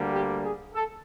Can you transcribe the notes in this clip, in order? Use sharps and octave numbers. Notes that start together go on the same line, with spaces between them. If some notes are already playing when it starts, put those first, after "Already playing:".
Already playing: D2 D3 G3 A#3
G4
G#4
A4